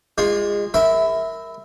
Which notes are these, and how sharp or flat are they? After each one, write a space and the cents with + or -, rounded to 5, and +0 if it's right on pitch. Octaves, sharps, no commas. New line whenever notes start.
G#3 -25 F4 +0
A#4 -10 E5 -15 B5 +20